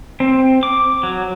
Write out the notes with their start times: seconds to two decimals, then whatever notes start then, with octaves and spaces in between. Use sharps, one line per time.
0.20 C4
0.63 D6
1.03 F#3